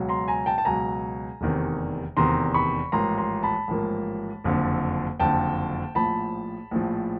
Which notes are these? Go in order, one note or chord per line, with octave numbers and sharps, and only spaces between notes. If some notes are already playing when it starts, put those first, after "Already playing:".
Already playing: C#2 B2 F#3
A#5 C6
G#5 A#5
G5 A5
A5
C#2 B2 F#3 G#5 A#5
F1 E2 C3 D#3
F1 E2 C3 D#3 A#5 C6
B5 C#6
A1 G#2 F3 A#3 A#5 C6
A#5 C6
A5 B5
A1 G#2 F3 A#3
F#1 F2 D3
F#1 F2 D3 G5 A5
A#1 A2 F3 A5 B5
A#1 A2 F3